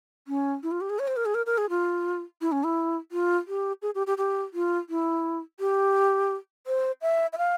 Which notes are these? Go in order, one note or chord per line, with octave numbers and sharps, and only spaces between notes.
C#4
E4
F4
G4
G#4
C#5
C5
A#4
G#4
A#4
A#4
G#4
F4
E4
C#4
E4
F4
G4
G#4
G4
G4
G4
F4
E4
G4
C5
E5
E5
F5